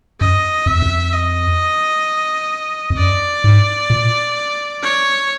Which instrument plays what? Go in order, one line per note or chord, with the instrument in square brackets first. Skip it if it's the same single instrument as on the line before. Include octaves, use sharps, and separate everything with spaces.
[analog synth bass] F#2 [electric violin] D#5
[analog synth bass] F2 [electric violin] E5
[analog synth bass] E2
F2
[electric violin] D#5
[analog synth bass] F2
[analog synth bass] F#2 [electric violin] D5
[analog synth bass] G#2
A#2
[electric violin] C#5